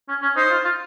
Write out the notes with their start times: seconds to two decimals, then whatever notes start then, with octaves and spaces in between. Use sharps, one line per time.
0.09 C#4
0.22 C#4
0.36 D#4 C5
0.50 F4
0.65 F4